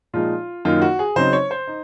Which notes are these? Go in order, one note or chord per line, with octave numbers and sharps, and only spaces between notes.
A#2 F3 G#3 D#4 F4
F#2 D#3 A#3 D#4 F4
F#4
G#4
C#3 F#3 C4 D#4 C5
C#5
C5
D#4